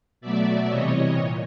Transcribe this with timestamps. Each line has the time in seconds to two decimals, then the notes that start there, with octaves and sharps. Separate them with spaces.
0.21 B2 F#3 A3 D5 E5
0.69 C3 E3 G3 C#5 D#5
1.16 A#2